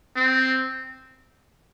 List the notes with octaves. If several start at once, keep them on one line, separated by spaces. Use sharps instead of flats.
C4